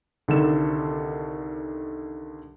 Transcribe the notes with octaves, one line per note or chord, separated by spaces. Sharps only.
C2 D3 D#3 A4 E7